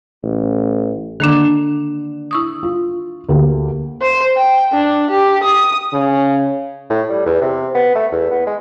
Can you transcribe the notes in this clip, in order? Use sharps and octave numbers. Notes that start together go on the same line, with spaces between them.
A1
D3 D#3 A#3 D4
E4 C#6 D#6
F4
D2 A#3 G4
C5
G5
D4
G4
D#6
C#3
A2
G3
E2
C3
B3
A3
E2
B3
G#3